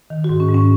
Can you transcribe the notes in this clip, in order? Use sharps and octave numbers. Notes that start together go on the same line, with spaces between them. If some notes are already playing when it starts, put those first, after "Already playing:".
D#3
F#4
G#2
C#4
G#2
C#4